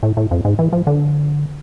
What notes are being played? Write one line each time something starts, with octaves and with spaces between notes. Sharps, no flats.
A2
A2
F2
G#2
E3
F3
D3